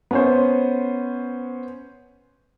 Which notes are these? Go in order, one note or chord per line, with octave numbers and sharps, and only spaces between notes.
B3 C#4 C5